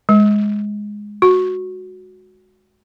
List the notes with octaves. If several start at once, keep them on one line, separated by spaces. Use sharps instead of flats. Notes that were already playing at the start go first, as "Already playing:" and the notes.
G#3
F#4